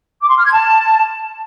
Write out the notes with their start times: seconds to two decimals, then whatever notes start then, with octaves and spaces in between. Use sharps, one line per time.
0.22 D6
0.29 C6
0.37 F6
0.45 G#6
0.53 A5